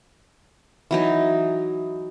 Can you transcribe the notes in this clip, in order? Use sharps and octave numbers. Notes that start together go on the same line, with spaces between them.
E3 F#3 D#4